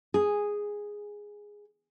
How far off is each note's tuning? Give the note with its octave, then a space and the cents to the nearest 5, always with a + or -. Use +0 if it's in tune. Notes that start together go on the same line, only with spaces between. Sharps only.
G#4 -5